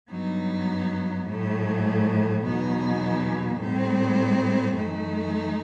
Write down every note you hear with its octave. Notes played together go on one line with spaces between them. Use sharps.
G2 F#3 B3 D#4
A2 F#3 A3
E2 B2 F#3 B3 D#4
A2 G3 C4
F#2 E3 A3 D#4